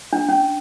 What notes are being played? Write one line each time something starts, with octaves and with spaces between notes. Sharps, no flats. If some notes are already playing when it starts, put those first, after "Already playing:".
D4
C#4